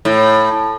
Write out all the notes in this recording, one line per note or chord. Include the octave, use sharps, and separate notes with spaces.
A2